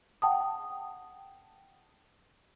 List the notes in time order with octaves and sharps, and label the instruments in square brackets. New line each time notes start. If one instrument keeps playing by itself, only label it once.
[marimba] F#5 G5 A5 D#6